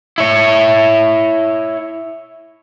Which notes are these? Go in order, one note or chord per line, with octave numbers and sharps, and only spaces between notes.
E4 C#5